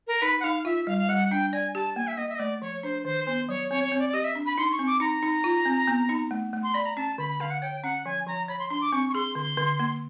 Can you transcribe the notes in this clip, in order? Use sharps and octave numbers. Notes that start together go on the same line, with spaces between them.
A#4
D#4 B4
F#5
D#4 F5
F4 E5
G3 F5
F5
G3 F#5
D4 G5
D5 G#5
G4 A5
A#3 G#5
E5
A#3 D#5
E5
D#5
A3 D5
F3 C#5
D4 C5
D#3 C5
B3 C5
F#3 C#5
C4 C#5
C#5
C4
D5
D5
G4 D#5
E5
D4
B5
D#4 C6
C#6
C4
D6
D#4 A#5
D#4
F4
C4
B3
D#4
A3
A3
C6
D5 B5
A#5
C#4 A5
D3 B5
B5
D3 F5
F#5
C#5 G5
C#4 F#5
F3 G#5
F3 A#5
C#5 B5
C6
D4 C6
D6
C4 C#6
C#6
G#4 C6
D3
D3
A#3